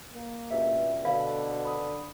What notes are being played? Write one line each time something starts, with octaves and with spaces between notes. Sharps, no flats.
A#3
C#2 G2 B2 E5
D2 B2 D3 F5 B5
B5 D#6